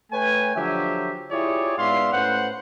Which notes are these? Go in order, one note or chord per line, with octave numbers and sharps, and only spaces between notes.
A3 B4 C#5 G5 G#5
D3 F3 F#3 G4 E5
E4 F4 G4 G#4 C#5 D5
G#2 B3 D5 E5 F5 C6
A2 C#4 B4 C5 F#5